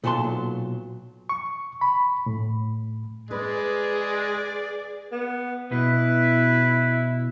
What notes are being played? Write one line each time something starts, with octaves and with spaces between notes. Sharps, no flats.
B1 A#2 F#3 A5 C6
C#6
B5
A2
G#3 G#4 B4 D5
B3
B2 E4 B4